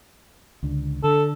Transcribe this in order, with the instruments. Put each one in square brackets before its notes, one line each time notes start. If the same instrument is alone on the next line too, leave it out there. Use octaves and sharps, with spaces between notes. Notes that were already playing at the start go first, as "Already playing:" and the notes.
[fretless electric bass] C#2 D3
[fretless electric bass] D3 [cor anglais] A4